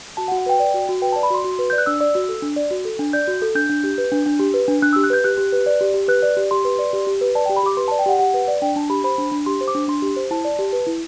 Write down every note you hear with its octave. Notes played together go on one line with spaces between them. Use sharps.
F#4 A5
F#5
F#4
F#5
B4 G5
D5
F#4
F#4
B4 G5
A5
D5
B5
F#4 C6
F#4
B4
D5 G6
F#6
D4 E6
D5
F#4
A4
D4
D5
F#4
A4
D4
D5 G6
F#4
A4
D4 G6
D4
G4
B4
D4
D4
G4
B4
D4
D4 F#6
E6
G4
F#6
B4 G6
G4 F#6
G4
B4
D5
G4
G4
B4 F#6
D5
G4
G4 C6
B4
D5
G4
G4
B4
D5 A5
G5
G4
B5
G4 D6
B4 C6
A5
D5
G5
G4 F#5
G4 F#5
B4
D5
D4 G5
D4 A5
G4 B5
C5 B5
D4
D4
G4 C6
C5
D6
D4
D4 C6
G4
C5
E4 A5
D5
G4
B4
E4